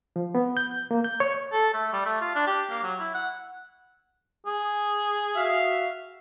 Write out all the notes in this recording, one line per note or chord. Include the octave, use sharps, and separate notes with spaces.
F3
B3
G6
A#3
G6
C#5
A4
A3
G3
A3
F4
D4
G4
A#3
F#3
E4
F#5
G#4
F#4 E5 F5